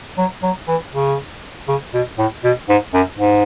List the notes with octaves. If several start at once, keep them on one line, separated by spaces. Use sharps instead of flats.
F#3
F#3
E3
C#3
C#3
B2
A2
B2
G#2
F#2
G#2